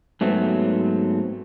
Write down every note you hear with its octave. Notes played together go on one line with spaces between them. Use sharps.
G#2 F#3 A3 B3 C4